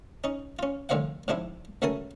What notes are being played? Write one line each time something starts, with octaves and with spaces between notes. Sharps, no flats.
C#4 D#4
C#4 F4
C2 A2 D3 F3 F5 F#5
G#2 C3 F3 D4 E4
C#2 F#3 A3 A#4 G#5 A5